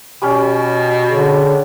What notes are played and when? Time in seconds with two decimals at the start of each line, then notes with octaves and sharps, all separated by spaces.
0.22 B2 G3 C#4
1.10 D3 G#4 C#5